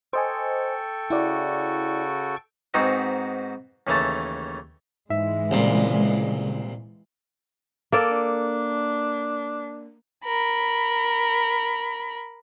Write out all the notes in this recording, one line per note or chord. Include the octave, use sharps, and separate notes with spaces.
A4 C5 D#5 G5 G#5 C#6
C#3 E4 F#4 D5
G#2 G#3 B3 C4 D#4 F#4
D#2 C#3 E3 A3 A5
G#2 E3 G#3 E5
C2 A#2 C#3
A#3 A4 D5
D4
A#4 B5